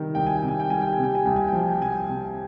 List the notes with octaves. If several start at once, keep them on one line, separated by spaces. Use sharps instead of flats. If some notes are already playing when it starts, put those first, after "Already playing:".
Already playing: C3 D#3 G3
C2 G5
G#5
G5
C3
G#5
G5
G3 G#5
G5
G#5
C3
G5
G#5
C2 G5
G#5
G5
F3
G#5
G5
C2 G#5
G5
C3